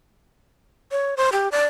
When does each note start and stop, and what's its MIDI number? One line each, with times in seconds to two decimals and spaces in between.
0.91 1.15 73
1.17 1.29 72
1.32 1.48 67
1.52 1.66 74